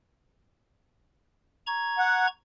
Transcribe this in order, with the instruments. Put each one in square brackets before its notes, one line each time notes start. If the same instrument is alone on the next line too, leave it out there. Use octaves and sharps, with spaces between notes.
[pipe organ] A#5 C#6 G#6
[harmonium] F#5